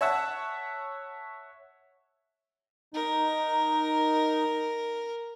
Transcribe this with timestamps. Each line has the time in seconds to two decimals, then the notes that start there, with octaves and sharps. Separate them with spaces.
0.01 C#5 E5 F#5 A5
2.94 D#4 A#4